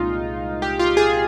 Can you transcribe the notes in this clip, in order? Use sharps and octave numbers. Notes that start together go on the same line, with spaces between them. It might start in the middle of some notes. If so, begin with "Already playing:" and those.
Already playing: C2 A#2 G#3 D#4 F4
G4
F4
G#4